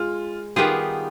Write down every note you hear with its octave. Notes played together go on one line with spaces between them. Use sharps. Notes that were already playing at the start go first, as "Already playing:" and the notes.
Already playing: G#3 F4 G#4
D#3 G3 B3 F4 G4 G#4